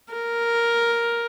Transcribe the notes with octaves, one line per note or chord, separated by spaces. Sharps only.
A#4